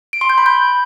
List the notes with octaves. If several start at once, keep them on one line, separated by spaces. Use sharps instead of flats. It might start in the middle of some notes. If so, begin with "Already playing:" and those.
D7
C6
G6
B5
G6